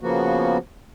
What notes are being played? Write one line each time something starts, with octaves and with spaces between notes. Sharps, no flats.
C#3 F3 A#3 B3 F#4